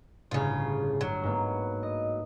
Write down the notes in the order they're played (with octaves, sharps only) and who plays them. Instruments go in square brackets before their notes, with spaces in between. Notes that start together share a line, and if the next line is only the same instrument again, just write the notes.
[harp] G1 A2 [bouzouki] C#3 F4
[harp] G1 [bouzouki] F#3
[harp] G#2 A#3 B3
D#5